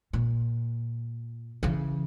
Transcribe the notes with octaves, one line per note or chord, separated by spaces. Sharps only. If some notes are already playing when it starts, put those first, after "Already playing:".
A#2
C#3 E3